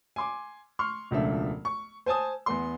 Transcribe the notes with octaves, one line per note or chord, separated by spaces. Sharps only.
G#5 C6 D6
C6 C#6 F6
E1 C#2 F3 A3 D4 E5
C#6
C5 G#5 A5 D#6
E2 B3 C6